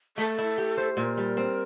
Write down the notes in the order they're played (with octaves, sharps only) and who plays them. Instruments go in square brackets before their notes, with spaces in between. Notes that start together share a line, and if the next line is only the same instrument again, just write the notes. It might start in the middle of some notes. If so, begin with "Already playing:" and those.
[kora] A3 [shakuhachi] A4
[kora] E4
G4
C5
[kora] A#2 [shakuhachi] A#4
[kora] G3
C4